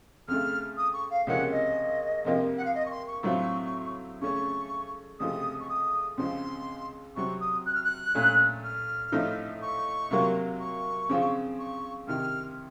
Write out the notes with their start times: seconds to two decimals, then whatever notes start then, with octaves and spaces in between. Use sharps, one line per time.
0.28 F2 C#3 A3 F6
0.77 D#6
0.93 C#6
1.10 F5
1.27 C#2 C3 F3 A#3 C#4 F#5
1.52 D#5
2.25 F2 C3 F3 A#3
2.57 F#5
2.65 F5
2.75 D#5
2.86 C#6
2.91 C6
3.07 C#6
3.23 A2 F#3 C4 F4 C#6
4.21 C#3 A3 C#4 C#6
5.20 C#2 C3 F3 A3 D#6
5.60 C#6
5.69 D#6
6.17 C#2 C#3 F3 C4 C6
7.16 C3 F#3 C4 C#6
7.40 D#6
7.66 F#6
7.75 F6
7.84 F#6
8.15 A#2 A3 C#4
8.64 F6
9.12 A2 F3 A3 D#4
9.62 C#6
10.11 C3 F#3 A#3 F4
10.60 C#6
11.09 C#3 F3 C4 F4
11.59 C#6
12.07 C2 C3 D#3 F6